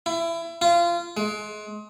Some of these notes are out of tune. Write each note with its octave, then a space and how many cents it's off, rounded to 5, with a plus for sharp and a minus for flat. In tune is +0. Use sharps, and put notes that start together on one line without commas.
E4 +25
F4 -25
G#3 +30